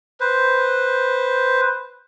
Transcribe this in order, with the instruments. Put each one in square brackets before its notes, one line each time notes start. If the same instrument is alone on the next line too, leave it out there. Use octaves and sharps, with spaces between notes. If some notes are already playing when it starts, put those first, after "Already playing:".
[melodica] B4 C5